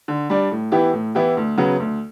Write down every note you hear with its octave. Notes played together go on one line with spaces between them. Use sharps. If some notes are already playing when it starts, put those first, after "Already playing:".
D3
G3 D4
A2
E3 B3 E4 G4
A2
E3 B3 E4 G4
D2
C#3 F#3 B3 F#4
D2